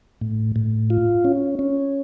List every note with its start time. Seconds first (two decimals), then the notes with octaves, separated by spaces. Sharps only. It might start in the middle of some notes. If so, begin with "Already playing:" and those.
0.21 A2
0.56 A2
0.90 F4
1.25 C#4
1.59 C#4